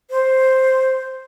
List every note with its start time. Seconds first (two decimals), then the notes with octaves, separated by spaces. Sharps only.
0.10 C5